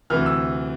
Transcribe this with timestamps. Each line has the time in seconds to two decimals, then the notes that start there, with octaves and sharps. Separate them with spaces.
0.10 D2 C3 E3 F6
0.26 E6